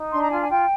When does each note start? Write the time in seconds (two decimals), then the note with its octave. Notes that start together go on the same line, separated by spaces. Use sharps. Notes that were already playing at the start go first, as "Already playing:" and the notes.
Already playing: D#4
0.11 D4 C6
0.22 A#5
0.30 F4 G#5
0.41 G#5
0.49 F4 G5